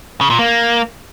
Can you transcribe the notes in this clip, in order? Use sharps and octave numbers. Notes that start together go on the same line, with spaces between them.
C#3
A#2
A#3